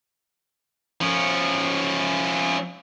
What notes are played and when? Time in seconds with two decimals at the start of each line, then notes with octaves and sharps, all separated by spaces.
1.01 F3 C#4